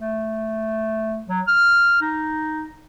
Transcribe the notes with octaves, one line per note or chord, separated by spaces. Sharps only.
A3
F#3
F6
D#4